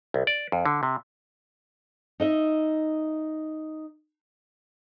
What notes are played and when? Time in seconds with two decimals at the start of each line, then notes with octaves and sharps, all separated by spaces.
0.14 C2
0.27 D5
0.52 F2
0.65 D3
0.83 C3
2.20 D#4 D#5 E5